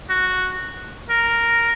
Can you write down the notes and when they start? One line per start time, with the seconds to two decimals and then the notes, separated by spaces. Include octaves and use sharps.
0.09 F#4
1.09 A#4